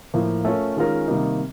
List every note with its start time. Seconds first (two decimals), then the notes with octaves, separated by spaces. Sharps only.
0.14 A2 F3 A#3
0.45 A3 C#4 F4 A#4
0.76 D#3 G#3 C#4 F4 A#4
1.07 C3 D#3 G3 A#3 D#4